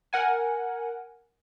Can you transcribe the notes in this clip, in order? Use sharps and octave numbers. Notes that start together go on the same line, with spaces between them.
A#4 F#5 G#5